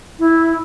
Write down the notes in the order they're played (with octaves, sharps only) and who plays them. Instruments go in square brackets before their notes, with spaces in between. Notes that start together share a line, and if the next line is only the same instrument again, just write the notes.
[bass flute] E4